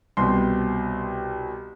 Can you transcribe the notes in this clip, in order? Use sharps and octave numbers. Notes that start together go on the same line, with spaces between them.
C2 B2 G3 C4 C6